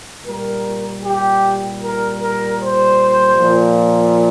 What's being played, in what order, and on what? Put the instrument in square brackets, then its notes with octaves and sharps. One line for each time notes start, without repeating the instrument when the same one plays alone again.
[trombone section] A#2 G3 A#4
G4
A#4
A#4
C5
A#2 F3